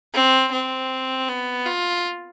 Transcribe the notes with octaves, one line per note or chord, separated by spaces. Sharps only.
C4
C4
B3
F4